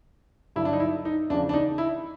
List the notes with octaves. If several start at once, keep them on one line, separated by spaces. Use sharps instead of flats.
G2 D3 F#3 E4
D4
D#4
E4
D#4
E2 C#3 F3 D4
D4
D#4
E4